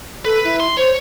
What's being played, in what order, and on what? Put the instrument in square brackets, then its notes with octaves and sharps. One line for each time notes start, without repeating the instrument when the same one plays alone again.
[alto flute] A4 [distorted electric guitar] B4
[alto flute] E4
[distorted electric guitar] C6
[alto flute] C5 [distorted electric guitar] C#5